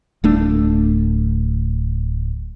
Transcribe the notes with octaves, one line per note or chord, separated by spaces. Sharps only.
D1 A3 D4